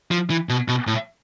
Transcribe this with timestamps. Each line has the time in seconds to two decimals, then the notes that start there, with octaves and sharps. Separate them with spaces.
0.11 F3
0.30 E3
0.49 B2
0.68 B2
0.87 A2